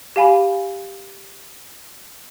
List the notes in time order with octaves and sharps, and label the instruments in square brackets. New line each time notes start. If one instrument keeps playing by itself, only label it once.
[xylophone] G4 F5 G#5 B5